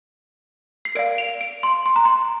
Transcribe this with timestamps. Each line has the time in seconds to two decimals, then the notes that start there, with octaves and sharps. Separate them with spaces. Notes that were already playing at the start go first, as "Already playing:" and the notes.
0.85 C7
0.95 A#4 D5 F5 D7
1.18 F7
1.41 D7
1.63 C6
1.86 C6
1.96 A#5
2.05 C6